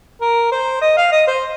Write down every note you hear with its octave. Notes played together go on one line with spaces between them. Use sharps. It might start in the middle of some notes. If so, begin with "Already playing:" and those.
A#4
C5
D#5
F5
D#5
C5